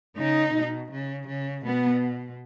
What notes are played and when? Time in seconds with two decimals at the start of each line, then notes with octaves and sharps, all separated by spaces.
0.17 C#3 D#4
0.54 B2
0.92 C#3
1.28 C#3
1.65 B2 B3